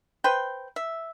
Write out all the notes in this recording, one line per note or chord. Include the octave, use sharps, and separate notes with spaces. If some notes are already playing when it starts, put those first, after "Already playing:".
B4 C5 G5
E5